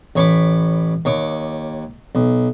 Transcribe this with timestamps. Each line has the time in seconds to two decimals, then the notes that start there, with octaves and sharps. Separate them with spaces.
0.16 A1 C#5 B5 D6
1.05 D#2 C#5 D6
2.15 B1